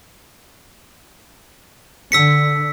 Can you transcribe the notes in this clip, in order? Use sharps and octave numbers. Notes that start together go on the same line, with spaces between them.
D3 E6 B6 C#7